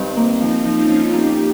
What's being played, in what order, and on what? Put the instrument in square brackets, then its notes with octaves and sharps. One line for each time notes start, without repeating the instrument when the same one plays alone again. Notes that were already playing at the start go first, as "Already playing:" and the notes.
Already playing: [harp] G2 D#3 [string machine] C4
[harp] A#3
[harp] F3 [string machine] C4 D#4
[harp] F3
[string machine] C#4 F4
[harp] F3
[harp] A#3 [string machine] D#4 G4